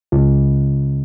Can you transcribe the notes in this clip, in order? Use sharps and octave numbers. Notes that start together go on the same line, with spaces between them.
C#2